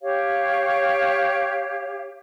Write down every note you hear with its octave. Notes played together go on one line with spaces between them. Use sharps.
G4 C#5 F5